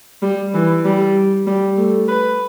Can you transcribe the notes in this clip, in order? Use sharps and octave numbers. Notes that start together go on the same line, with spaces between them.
G3
E3
G3
G3
A3
B4